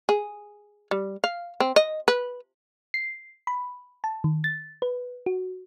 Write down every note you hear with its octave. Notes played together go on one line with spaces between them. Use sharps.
G#4
G3
F5
C4
D#5
B4
C7
B5
A5
D#3
A6
B4
F#4